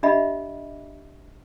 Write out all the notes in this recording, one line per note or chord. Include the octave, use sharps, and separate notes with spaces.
D4 G4 D#5 E5 F#5 B5